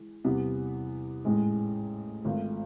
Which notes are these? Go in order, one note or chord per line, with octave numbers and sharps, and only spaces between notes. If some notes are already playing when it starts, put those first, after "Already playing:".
Already playing: E3 G#3
E2 C3 E3 G3 B3
A1 G#2 E3 G#3
G#1 G#2 F3 A3